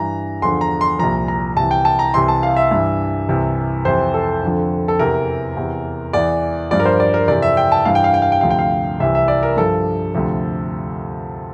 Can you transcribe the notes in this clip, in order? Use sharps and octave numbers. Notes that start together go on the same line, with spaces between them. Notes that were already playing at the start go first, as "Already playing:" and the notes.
Already playing: G2 E3 A#5
E2 D3 F3 C6
A#5
C6
C2 A#2 F3 A#5
A#5
C2 C3 E3 A5
G5
A5
A#5
C2 C3 E3 C6
A5
F5
E5
G2 E3
C2 C3 E3
F2 C3 E3 C5
A4
F2 D3 F3
A4
E2 C3 E3 A#4
E2 C3 E3
E2 E3 D5
G2 F3 D5
A#4
C5
D5
A#4
F2 C3 E3 D5
E5
G5
A5
G2 E3 F5
G5
F5
G5
F5
G5
D2 C3 F3 F5
G5
F5
C2 C3 E3 E5
E5
D5
A#4
G2 F3 A4
D2 C3 F3